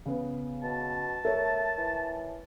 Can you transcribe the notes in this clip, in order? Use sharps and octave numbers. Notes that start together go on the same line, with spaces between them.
C#3 B3
B2 A5
A3 A#4 C#5
E3